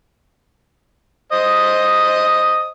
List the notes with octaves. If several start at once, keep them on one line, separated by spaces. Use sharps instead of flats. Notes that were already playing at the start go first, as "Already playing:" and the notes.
C5 D#5 D#6